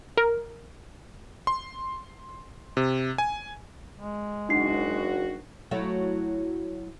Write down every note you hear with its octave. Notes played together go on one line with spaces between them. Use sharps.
A#4
C6
C3
G#5
G#3
F#1 D4 D#4 F#4 C7
F#3 A3 E4